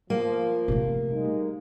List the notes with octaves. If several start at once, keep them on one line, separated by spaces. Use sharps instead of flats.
F3 A#3
C3 A3
G3 G#3 D#4